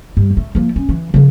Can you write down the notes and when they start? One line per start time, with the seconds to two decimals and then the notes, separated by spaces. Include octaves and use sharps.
0.17 G2
0.37 A3
0.55 F3 A#3
0.76 C#4
0.89 E3
1.14 C#3 F3